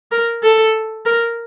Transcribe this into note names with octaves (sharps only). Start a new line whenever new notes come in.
A#4
A4
A#4